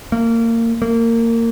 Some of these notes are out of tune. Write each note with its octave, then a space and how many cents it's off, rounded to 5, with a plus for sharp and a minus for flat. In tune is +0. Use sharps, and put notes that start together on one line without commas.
A#3 -25
A#3 -25